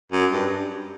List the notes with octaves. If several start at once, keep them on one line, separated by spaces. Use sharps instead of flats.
F#2
G2